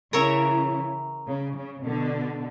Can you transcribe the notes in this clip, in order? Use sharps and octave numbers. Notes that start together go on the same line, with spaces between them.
C#3 E3 A#4 C#5 E5 A#5
C#3
C#3
B2 D3